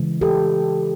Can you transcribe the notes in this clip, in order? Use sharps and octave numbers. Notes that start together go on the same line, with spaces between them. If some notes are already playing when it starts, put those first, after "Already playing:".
Already playing: C#3 E3 G#3
G4 A4